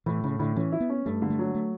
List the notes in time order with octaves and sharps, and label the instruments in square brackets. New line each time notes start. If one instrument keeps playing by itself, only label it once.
[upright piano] A2 [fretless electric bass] E3
[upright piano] A2 [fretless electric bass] C#3
[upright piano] A2 [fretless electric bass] D3
[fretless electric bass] E3 [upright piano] C#4
[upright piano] E4
[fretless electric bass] B3
[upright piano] C#4
[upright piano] G2 [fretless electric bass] A3
[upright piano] D3
[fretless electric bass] A3
[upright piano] F#3
[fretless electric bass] A3